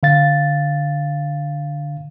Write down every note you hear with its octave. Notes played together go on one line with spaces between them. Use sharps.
D3 F5 A6